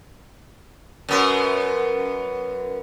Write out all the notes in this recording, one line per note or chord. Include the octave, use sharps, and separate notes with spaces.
F#2 B3